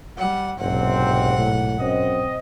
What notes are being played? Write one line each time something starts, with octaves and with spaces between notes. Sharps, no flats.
G3 F#5
F#1 B1 G#2 C3 C4 F#5
A2
F#2 C4 C5 D#5